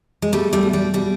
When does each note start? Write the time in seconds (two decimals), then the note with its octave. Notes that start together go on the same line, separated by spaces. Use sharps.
0.22 G#3
0.32 B2 G3 A3
0.53 G3 A3
0.63 B2
0.73 G3
0.94 B2 G3